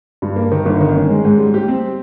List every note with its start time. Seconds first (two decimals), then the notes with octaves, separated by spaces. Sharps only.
0.22 G2
0.36 A#3
0.51 D#3
0.66 G1
0.81 D#3
0.94 C#4
1.09 G#3
1.25 G#2
1.38 G3
1.54 G4
1.68 C4